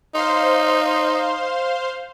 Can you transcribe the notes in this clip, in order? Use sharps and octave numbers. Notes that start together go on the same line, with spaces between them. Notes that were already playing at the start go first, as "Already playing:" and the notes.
D#4 C5 F5 C6